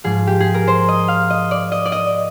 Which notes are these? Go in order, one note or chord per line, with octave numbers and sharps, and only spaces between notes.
G#2 F3 G#4
G4
G#4
A#4
C5
D#5
F5
D#5
D5
D#5
D5
D#5